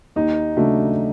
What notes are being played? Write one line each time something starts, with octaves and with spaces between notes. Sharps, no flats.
D#2 D#4
C#3 F#3 A3 D4